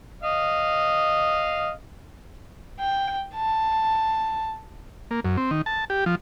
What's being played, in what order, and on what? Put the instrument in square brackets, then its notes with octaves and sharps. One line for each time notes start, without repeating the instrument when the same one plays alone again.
[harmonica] D#5 F5
[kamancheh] G5
A5
[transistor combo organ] A#3
F#2
C4
D#3
A5
G4
F3